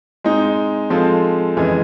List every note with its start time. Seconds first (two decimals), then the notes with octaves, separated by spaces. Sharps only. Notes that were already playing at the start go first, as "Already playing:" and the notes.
0.24 G#3 C4 D#4
0.90 F3 G#3 C4 F4 A4
1.57 F2 C#3 E3 G#3